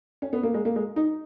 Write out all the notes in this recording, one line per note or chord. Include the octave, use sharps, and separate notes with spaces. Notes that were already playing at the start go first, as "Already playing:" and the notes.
C#4
B3
A#3
G#3
A#3
G#3
D#4